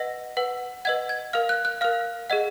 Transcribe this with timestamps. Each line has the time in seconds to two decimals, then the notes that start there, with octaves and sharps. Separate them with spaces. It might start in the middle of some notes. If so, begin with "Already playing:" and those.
Already playing: B4 D#5 F#5 A#6
0.37 B4 F#5
0.85 B4 D#5 F#5 G#6
1.09 G#6
1.33 A#4 F5 F6
1.49 F#6
1.65 F#6
1.81 A#4 F5 F6
2.30 G#4 D#5 F#5